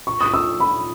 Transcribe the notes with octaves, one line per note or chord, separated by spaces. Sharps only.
C#6
D#6
E6
B5